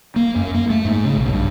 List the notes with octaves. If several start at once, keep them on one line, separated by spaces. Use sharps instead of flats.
A#3
F#2
A#3
A3
G#2
C#3
B1
G2